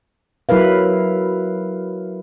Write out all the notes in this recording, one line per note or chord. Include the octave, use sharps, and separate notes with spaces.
F#3 E4 A#4 B4 F5